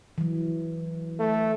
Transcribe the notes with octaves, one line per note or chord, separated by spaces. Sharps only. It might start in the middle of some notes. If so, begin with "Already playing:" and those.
E3 F#3
A3